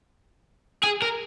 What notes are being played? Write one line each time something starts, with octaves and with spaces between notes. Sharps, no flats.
G#4
A#4